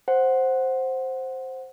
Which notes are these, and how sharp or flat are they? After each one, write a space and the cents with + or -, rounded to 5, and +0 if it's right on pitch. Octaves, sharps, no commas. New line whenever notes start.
C5 +5 F#5 +0